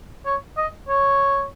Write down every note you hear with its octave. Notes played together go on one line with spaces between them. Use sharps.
C#5
D#5
C#5